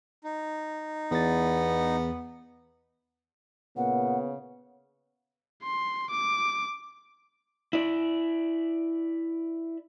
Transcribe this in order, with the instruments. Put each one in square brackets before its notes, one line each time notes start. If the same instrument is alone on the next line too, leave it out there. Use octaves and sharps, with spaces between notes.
[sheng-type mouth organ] D#4
[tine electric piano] E2 A6 [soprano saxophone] B3
[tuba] A#2 [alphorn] C#3 [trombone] B3 [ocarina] F#5
[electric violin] C6
D6
[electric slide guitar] E4 D5